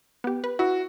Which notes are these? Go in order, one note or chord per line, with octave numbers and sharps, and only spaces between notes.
B3 G4
B4
E4 F#4